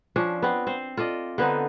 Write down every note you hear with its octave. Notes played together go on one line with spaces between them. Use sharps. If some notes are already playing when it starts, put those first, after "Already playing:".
F3 C#4 D4
B3 C4
C4 C5
F4 A4 D5 D#5
D3 B3 C4 D#4